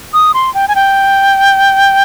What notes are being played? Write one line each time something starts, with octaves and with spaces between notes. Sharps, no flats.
D#6
C6
G5
G#5
G5